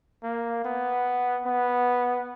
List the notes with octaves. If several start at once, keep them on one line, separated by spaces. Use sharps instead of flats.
A#3
B3
B3